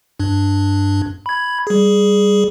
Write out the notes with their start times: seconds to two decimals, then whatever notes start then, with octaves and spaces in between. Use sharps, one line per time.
0.20 G2 D4
1.26 B5 G#6
1.67 G3 G#4